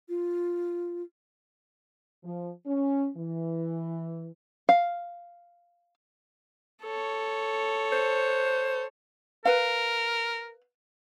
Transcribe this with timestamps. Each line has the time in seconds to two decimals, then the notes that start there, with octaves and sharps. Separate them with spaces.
0.09 F4
2.24 F3
2.66 C#4
3.16 E3
4.69 F5
6.82 A4 C#5
7.92 C5
9.45 A#4 B4 F5